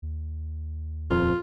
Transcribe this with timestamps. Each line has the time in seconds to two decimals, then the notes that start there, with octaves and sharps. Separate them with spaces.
0.02 D#2
1.11 D#1 F2 F4